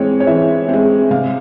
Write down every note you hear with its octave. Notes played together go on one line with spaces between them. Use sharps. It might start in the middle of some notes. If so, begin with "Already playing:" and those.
Already playing: E3 G#3 C4 C#5
C#5
E3 E5
G#3 C4
C3 F5